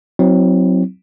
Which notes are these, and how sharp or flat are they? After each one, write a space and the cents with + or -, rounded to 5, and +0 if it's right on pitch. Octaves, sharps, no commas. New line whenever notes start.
F#3 +0 C4 -5 E4 -45